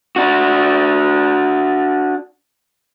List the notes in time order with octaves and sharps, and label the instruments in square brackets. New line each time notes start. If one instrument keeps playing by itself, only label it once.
[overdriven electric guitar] D4 F#4